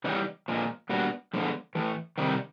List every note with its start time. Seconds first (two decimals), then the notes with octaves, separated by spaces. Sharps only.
0.04 C#3 E3 G3 B3 D#4
0.48 A#2 F3 G#3
0.89 A#2 G3 B3 D4 F#4
1.33 D3 F3 G#3 B3
1.75 A2 E3 A3
2.18 C3 D#3 G3 C4 D#4